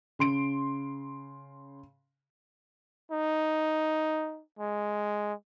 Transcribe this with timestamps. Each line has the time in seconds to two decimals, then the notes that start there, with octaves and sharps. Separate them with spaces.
0.19 C#3 C6 D7
3.11 D#4
4.59 G#3